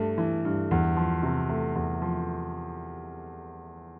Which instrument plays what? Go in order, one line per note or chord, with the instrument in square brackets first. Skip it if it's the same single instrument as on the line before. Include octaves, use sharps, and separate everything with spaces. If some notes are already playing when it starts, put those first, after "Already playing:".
Already playing: [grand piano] G2 A3
E3
G2
E2
F3
C3
A3
E2
F3